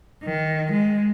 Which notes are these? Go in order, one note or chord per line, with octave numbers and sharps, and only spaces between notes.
D#3
G#3